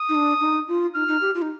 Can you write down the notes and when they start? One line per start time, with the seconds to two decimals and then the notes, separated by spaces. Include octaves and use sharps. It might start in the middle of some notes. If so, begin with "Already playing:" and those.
Already playing: D#6
0.09 D#4
0.15 D4
0.41 D#4
0.68 F4
0.95 D#4 F6
1.08 D#4
1.21 G4
1.35 F4
1.42 D#4